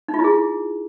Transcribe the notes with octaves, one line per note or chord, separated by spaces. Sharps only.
D#4
F4
E4
G#4